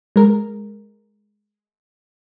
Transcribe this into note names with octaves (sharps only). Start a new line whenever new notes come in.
G#3 A#4